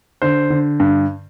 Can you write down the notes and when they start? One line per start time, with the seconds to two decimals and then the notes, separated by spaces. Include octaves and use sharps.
0.22 D3 C5
0.50 D3
0.80 G2